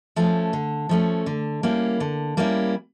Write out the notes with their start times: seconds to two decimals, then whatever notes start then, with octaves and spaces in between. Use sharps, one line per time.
0.16 F3 A3 C#4
0.53 D3
0.89 F3 A3 C#4
1.26 D3
1.63 G3 A#3 C#4 E4
2.00 D3
2.37 G3 A#3 C#4 E4